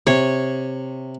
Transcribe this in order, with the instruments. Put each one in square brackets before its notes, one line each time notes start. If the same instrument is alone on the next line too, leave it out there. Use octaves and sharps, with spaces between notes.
[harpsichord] C3 [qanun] C#5